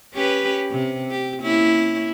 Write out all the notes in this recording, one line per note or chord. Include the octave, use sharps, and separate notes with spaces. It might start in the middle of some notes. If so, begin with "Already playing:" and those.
C#4 G4 B4
C3
G4
A#3 C#4 E4